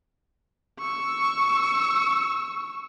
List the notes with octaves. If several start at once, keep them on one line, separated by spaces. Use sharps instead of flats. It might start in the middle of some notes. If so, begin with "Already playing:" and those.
C#6 E6